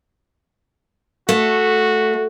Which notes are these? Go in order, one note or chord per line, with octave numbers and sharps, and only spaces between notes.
A3 F#4